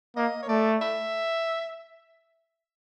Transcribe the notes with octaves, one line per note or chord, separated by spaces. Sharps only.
A#3 D#5
C#5
A3 D5
E5